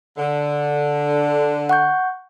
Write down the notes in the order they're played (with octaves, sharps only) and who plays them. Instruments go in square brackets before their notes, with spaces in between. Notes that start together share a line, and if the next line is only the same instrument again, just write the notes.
[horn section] D3
[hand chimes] F#5 C#6 G6